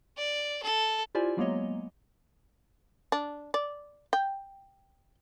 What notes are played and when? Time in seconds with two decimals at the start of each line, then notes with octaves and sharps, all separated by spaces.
0.17 D5
0.63 A4
1.15 E4 F4 G4 C5 D5 G#5
1.37 F#3 G#3 A#3 B3 C#5 D#5
3.12 D4
3.54 D5
4.13 G5